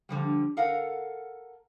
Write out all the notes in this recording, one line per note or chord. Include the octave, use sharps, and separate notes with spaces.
D3 F3 G3
A4 A#4 F5 F#5